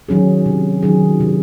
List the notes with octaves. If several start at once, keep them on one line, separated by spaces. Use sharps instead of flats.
D#3 F#3 C#4 G#4
C3
D#3 F#3 C#4 G#4
C3